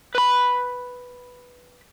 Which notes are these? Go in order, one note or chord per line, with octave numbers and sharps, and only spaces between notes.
B4 B5